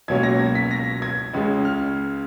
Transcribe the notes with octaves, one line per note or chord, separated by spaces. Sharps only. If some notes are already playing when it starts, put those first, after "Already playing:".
C#2 B2 F#3 A#3 C#4 G#6
A#6
G#6
B6
A#6
G#6
C#2 C#3 G#3
F6